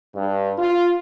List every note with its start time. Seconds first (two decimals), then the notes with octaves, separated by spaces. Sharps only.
0.15 G2
0.59 F4